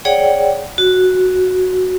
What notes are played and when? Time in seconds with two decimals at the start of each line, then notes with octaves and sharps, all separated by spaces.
0.05 G#4 C#5 D5 F#5 G5
0.78 F#4